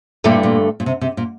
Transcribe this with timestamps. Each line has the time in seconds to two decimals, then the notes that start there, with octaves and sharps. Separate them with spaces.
0.24 G2 A#2 D3 A3
0.43 A#2
0.80 A#2
0.86 C3
1.01 C3
1.17 A#2